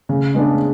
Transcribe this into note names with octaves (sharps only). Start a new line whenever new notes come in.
C#3
G#3 B3 D4 G#4